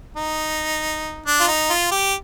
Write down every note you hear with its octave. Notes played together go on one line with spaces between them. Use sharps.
D#4
D4
F4
D#4
F4
G4